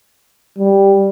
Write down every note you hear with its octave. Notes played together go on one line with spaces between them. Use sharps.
G3